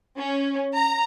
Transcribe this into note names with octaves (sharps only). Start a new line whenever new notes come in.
C#4
A#5